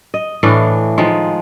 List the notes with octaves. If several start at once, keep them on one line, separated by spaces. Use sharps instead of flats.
D#5
A2 E3 D4 F5
D#3 F3 G#3